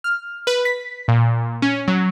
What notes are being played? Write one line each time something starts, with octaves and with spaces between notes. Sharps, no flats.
F6
B4
B6
A#2
C#4
F#3